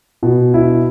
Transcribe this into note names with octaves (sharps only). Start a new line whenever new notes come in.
B2
E4